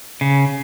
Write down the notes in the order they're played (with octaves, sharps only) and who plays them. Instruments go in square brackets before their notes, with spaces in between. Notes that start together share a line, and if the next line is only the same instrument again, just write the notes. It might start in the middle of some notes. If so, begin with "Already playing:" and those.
[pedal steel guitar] C#3